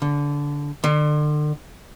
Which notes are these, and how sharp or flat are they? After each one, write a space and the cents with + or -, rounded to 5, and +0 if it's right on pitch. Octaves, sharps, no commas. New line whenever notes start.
D3 -20
D3 +35